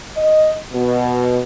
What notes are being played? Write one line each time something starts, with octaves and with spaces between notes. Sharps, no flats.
D#5
B2